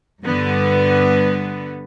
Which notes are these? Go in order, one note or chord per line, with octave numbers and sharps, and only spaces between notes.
G2 D3 B3